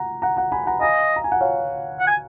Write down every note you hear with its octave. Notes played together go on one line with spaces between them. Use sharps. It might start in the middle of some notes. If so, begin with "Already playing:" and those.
Already playing: F#5 A#5
F#5 A#5
F#5 A#5
G#5 B5
F#5 A#5
D#5 F5 G#5
A#5
G#5
F#5
C#5 F5
F#5
G#5